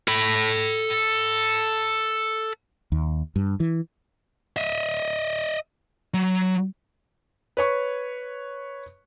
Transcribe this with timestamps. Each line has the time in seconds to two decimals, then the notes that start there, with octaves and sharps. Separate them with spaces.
0.08 A4 B5
2.92 D#2
3.36 G2
3.60 E3
4.56 D#5 E5
6.14 F#3
7.57 B4 C#5 C#6